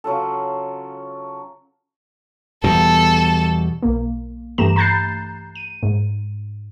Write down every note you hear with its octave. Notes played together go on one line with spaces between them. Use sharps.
C#3 F#3 F4 A4
E2 B2 G3 A4
B1 A#3
G2 E3 A3 G4 A#5 E7
A#5 B5 F#6 G6 A6 C7
D#7
G#2